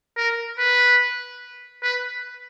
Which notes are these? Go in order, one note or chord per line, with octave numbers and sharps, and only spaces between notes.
A#4
B4
B4